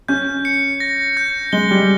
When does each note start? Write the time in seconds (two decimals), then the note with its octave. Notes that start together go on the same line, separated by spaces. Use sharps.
0.08 C#4 G6
0.45 C#7
0.80 A#6
1.17 G6
1.53 G#3 G7
1.71 G3